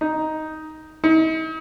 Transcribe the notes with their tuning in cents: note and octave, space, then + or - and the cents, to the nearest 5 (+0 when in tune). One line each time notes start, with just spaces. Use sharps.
D#4 +5
D#4 +45